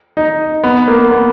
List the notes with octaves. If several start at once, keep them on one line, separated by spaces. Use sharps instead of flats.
D#4
B3
A#3
B3